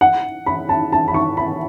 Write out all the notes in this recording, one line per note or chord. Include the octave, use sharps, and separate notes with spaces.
F#5
B5
A5
A5
B5
C#6
B5